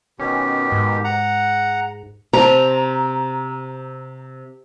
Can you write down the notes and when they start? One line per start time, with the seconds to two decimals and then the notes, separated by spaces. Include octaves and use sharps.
0.19 B2 D#3 C#4 G4
0.72 G#2
1.04 F#5 A#5
2.33 C3 C5 A#5